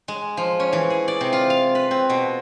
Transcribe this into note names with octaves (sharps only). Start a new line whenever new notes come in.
G#3
F3
C#4
E3
G#4
D5
C3
F4
F5
B4
C4
B2